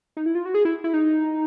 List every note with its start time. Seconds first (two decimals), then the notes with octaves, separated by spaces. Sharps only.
0.17 D#4
0.26 E4
0.35 F4
0.45 F#4
0.54 G#4
0.65 E4
0.84 E4
0.93 D#4